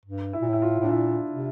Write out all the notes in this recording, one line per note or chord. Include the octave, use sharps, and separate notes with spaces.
G2
E4
A#2
A2 E4
F4
A2 D4
A#2 E4
C3